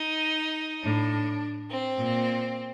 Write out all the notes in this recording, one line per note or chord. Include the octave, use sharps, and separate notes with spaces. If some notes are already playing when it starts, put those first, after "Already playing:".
Already playing: D#4
A2 D4
C4
A#2